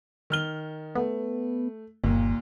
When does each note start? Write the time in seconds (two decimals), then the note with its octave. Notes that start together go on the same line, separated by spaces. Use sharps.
0.30 D#3 F6 G7
0.95 A3 B3
2.04 G1 D#2 A#2